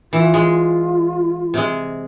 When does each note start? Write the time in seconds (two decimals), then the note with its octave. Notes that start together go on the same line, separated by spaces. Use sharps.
0.13 E3 F4
0.34 G#3
1.54 C3 G#3